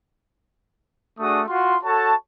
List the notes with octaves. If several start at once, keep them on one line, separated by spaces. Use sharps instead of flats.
A3 D4 F#4 G#4 D#6
F4 F#4 C6
F#4 A4 C#5 A5